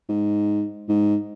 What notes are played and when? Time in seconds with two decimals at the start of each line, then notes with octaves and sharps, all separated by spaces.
0.09 G#2
0.89 G#2